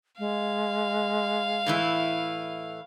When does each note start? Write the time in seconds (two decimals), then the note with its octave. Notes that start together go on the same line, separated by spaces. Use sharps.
0.19 G#3 F5
1.66 A2 E3 E4